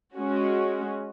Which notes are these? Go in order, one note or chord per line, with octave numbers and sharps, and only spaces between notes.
G#3 C#4 F#4